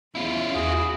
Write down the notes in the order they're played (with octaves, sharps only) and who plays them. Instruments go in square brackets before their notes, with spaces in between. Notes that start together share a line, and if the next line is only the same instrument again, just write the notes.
[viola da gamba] E2 C#4 [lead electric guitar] E4 F4
[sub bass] E2 [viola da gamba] F#4 [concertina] G#4